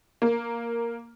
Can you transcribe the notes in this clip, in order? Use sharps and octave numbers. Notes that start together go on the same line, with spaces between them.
A#3